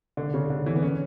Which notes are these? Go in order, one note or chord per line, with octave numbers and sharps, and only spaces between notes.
D3
C#3
D3
E3
B3
C#4